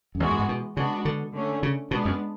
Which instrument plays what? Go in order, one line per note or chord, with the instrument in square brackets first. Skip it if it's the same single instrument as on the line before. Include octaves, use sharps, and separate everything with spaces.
[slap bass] F#2
[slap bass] E2 [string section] E3 G#3 B3 F#4
[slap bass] F#2
G#2
B2
[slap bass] C#3 [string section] G#3 B3 D4 F#4
[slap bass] D3
[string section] D3 A3 C#4
[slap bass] C#3
[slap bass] B2 [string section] G#3 B3 D4
[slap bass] F#2